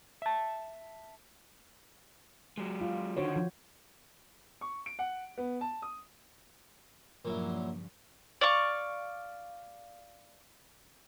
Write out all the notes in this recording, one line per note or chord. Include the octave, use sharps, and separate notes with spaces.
E5 A5
F#3 G#3
F4
D3 D#3 F#4 C5 C#5
F3
C#6
D7
F#5
B3
A5
D#6
G2 A#2 C#3 F3 F#3 E4
D5 F5 C#6